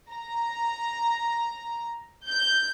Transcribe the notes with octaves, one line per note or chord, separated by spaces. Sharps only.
A#5
G6